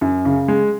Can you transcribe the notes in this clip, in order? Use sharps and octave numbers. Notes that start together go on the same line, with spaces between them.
F#2
C#3
G#3